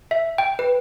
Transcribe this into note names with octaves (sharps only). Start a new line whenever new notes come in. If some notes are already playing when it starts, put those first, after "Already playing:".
E5
G5
B4